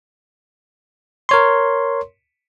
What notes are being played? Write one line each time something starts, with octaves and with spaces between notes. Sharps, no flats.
A#4 C#5 C6